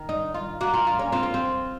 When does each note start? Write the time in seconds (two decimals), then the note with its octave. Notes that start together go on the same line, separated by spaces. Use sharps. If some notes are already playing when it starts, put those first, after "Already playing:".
Already playing: D#3
0.09 D#4
0.34 F4
0.61 A#3 F#4
0.74 F4
0.87 F4
0.99 C#4
1.12 C4 F4
1.23 A#3
1.34 C4